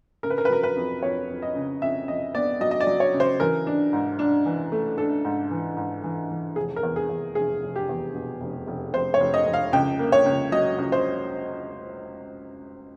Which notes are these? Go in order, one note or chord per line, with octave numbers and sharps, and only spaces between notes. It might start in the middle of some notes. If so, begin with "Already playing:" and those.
C#3 A#4
B4
A#4
B4
F#3 A#4
B4
F2
F2 C#5
F2
D#5
C#3
F2 E5
F2 D#5
B3 D5
F#3 D#5
D#5
D5
F#3
C#5
C#3
C5
E3 A#4
D4
G#2
D4
E3
A3
D4 A4
G#2
E3
G#2
E3
E3
F1 G#4
A#4
E2
G#4
E2
F1 G#4
F1
G4
E2
B2
F1
F1
F1 C5
C#5
F1
D#5
F1
F5
C#2 G5
A#3
C#5
C#2
F#3 D#5
C#2
C5